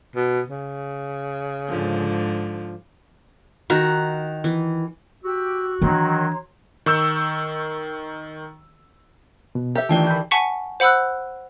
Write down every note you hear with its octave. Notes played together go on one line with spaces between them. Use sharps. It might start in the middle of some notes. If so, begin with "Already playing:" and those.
B2
C#3
G#2 D3 F3
D#3 F#4
E3
F#4 G4 E6
D#3 E3 F#3 D4 C#5 A#5 C6
D#3 C#6 E6 G6
B2
G4 A4 E5
D#3 E3 A3 D4 F4 D5 G5 A5
B5 G6
F#5 G#5 A5 C#6 B6 C#7
C5 F#5 B5 E6 F#6